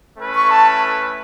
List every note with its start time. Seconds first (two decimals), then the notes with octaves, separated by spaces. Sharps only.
0.18 A3 C#4 E4 B4
0.35 C#6
0.50 A5